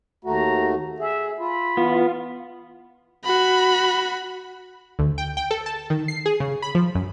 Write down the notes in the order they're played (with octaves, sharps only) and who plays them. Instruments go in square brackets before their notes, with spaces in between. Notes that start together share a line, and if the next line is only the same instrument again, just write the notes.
[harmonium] D#2 A3 F#4 [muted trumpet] A#5
[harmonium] G#4 [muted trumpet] E5
[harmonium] F4 [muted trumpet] B5
[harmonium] E3 [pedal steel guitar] B3 [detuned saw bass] F4
[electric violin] F#4 B5
[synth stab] D2
G5
G5
A4
A5
D#3
C7
G#4
C#3
B5
F3
F#2